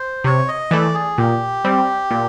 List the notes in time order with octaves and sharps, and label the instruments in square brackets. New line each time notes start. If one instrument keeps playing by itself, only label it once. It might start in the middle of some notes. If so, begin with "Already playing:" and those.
Already playing: [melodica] C5
[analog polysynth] C3 [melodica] C#5
[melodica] D#5
[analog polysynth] E3 A3 [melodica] D5
[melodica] G#4
[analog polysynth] A#2 [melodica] G4
[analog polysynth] G3 C4
A#2